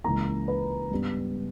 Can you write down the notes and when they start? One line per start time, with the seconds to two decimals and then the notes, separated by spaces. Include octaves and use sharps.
0.04 C#2 C#3 E3 A#3 A#5
0.48 B4
0.91 G2 G3 B3